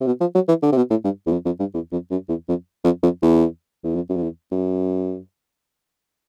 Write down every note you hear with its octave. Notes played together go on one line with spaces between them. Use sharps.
C3
B2
F3
F#3
E3
D3
C3
B2
A2
G2
E2
F2
F2
G2
E2
F2
F#2
E2
F2
F2
F2
E2
E2
F2
F#2
F2
E2
F#2